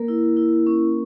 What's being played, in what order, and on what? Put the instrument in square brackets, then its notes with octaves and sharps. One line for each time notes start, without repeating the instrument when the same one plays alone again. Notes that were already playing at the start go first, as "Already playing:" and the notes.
Already playing: [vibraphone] A#3 A#4
E4
E4
C#4